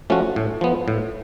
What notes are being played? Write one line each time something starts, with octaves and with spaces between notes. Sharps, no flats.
F3 A3 C#4 F#4
A2
F3 B3
A2